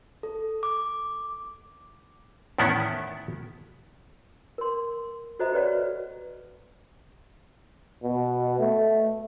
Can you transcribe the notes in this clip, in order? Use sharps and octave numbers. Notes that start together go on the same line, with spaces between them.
A4
D6
E2 A2 D#3 B3 C#4 E4
A#4 C6
F#4 A4 C5 D#5 E5 A#5
F#4 G4 B4 C#5 D5 F#5
B2
A3